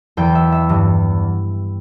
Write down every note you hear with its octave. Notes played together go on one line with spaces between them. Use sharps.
E2 E3 G5
E5
E5
G2 E3